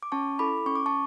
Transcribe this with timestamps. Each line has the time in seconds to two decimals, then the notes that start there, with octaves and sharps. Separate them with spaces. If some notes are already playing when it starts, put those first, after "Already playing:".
0.03 D6
0.12 C#4 A5 C#6
0.39 E4 A4 B5 D6
0.66 C#4 C#6
0.76 D6
0.86 A5 C#6